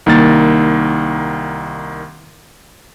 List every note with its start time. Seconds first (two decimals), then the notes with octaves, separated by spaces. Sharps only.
0.06 C2 D#3 A#3 A6